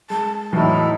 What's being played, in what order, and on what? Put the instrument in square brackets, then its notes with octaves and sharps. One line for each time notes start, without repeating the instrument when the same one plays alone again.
[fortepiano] G#3 [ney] A5
[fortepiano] E2 A2 F#3 [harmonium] D#4 E4